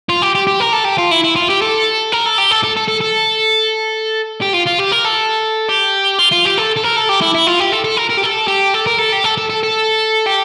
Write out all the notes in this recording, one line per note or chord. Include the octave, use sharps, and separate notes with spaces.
F4
G4
G4
G4
A#4
A4
G4
F4
E4
E4
F4
G4
A4
A#4
A4
G4
A4
A4
A4
A4
A4
G4
F4
F4
G4
A#4
A4
G4
F4
F4
G4
A4
A4
A#4
A4
G4
E4
E4
F4
G4
A4
A4
A#4
A#4
G4
A4
G4
A4
A#4
A4
G4
A4
A4
A4
A4
G4